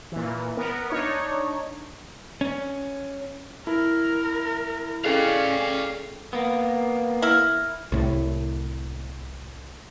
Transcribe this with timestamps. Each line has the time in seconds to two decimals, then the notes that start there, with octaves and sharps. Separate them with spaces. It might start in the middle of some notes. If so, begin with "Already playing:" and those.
0.12 A#2 E3
0.57 B3 A#4
0.90 D4 D#4 C#5
2.41 C#4
3.67 E4 A#4
5.05 C#4 G#4 A4 D5 F5 G5
6.33 A#3 B3
7.22 E4 A#4
7.92 C2 A2